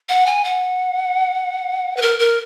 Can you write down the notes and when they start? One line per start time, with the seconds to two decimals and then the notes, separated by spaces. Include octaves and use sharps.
0.09 F#5
0.26 G#5
0.44 F#5
1.97 B4
2.02 A#4
2.19 A#4